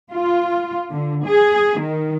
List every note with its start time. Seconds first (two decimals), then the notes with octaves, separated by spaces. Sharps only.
0.12 F4
0.91 D3
1.25 G#4
1.78 D#3